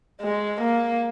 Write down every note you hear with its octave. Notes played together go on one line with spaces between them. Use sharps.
G#3
A#3